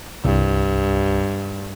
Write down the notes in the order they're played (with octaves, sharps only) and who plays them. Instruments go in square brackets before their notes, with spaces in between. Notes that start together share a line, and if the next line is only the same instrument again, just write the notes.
[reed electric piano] C2 [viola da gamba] G2